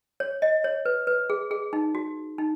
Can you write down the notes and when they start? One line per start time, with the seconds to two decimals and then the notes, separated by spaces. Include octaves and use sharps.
0.20 C#5
0.42 D#5
0.64 C#5
0.85 B4
1.07 B4
1.30 G#4
1.51 G#4
1.73 D#4
1.95 F#4
2.38 D#4